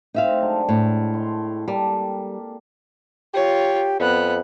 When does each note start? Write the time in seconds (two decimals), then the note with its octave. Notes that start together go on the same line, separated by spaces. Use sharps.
0.14 A2 C4 D#4 E5 F5
0.42 F#3 G#3 D4
0.69 A2
1.14 G#3 F5 C6
1.68 G3 A#3 G4 A4
3.34 F4 G4 C#5
4.00 F2 B3 F#6